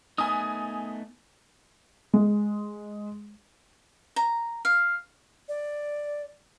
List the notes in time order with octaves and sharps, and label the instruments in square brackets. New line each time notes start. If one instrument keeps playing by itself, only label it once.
[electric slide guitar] A3 B3 D#4 [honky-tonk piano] G#5 D#6
[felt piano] G#3
[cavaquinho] A#5
F5
[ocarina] D5